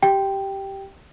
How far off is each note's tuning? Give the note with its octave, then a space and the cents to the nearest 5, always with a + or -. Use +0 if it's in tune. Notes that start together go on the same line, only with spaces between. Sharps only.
G4 -10 G5 +0